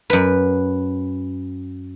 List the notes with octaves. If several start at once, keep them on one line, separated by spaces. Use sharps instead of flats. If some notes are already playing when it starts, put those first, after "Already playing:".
F#2 B4